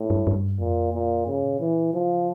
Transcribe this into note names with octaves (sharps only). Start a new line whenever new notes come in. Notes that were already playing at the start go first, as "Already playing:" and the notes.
Already playing: A2
G2
G2
F2 A#2
A#2
G2 C#3
A#2
E3
C#3 F3